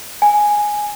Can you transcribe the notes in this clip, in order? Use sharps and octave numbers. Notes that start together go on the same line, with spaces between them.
G#5